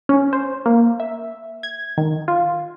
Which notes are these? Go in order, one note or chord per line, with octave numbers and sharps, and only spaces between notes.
C#4
C5
A#3
E5
G#6
D#3
F4